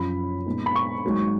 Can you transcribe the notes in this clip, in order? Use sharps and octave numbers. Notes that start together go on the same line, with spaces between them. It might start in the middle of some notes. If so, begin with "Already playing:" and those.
Already playing: F#1 F#2 F3 B5
A#2 G#3 B3 D#4
B5
C#6
G#1 G#2 F#3 A#3